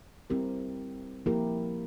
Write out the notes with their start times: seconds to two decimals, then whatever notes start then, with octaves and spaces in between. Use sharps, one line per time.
0.30 G3 C4 E4 G4 A#4
1.26 F3 A#3 E4 G4 A#4